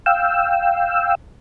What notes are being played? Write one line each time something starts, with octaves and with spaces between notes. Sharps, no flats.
F5 G5 E6